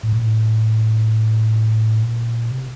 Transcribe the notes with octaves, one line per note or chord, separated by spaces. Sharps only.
A2
A#2
A2
A#2
C3